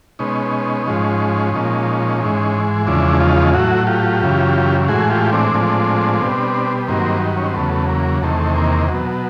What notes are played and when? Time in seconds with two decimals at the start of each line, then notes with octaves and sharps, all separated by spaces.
0.19 B2 G#3 C#4 D#4
0.87 G#2 F3 G#3
1.53 A#2 F3 G#3
2.20 G#2 E3 G#3
2.87 E2 C#3 F3 G#3 D4 E4
3.20 D#4 F4
3.54 A2 F#3 E4 F#4
3.87 F4 G4
4.21 F#2 C#3 E3
4.88 A2 E3 G#3 F#4 G#4
5.10 F4 G4
5.32 C4 D4
5.54 A2 F3 G#3
6.21 B2 G3
6.88 G2 D#3 F#3 A#3 C4
7.37 C#4
7.46 C4
7.55 E2 C#3 F#3 A3 B3
7.88 A#3
8.22 E2 C3 D#3 A3
8.56 A#3
8.89 F#3
8.94 B2